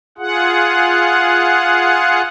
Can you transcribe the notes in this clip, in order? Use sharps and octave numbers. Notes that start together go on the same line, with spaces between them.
F4 G#4 F#5